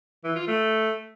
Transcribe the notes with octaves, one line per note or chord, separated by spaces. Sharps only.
E3
F4
A3